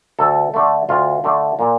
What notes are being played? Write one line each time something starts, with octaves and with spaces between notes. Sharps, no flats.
D2 A4
D3 A3
D2 F4
D3 A3
A#2